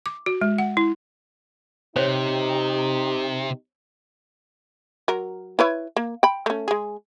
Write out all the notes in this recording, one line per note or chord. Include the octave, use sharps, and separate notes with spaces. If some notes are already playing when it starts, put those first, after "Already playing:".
D6
F#4
G#3
F#5
E4
C3 D#4 G4 C5 C#5
F#3 A#4
E4 B4 C#5
A#3
G5 B5
A3 C#4
G#3 G#4